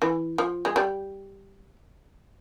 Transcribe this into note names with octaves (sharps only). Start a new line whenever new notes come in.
E3
F3
G#3
G3